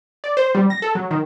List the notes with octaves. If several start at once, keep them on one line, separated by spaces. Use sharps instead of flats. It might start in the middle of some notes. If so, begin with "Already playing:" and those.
D5
C5
G3
A#6
A4
F#3
D#3